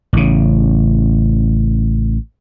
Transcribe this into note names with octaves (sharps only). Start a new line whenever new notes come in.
A1 C#3